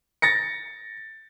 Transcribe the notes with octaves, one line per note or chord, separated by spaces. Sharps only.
A6 A#6 C#7